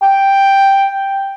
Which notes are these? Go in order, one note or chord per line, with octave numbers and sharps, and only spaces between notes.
G5